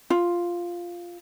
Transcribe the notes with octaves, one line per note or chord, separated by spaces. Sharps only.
F4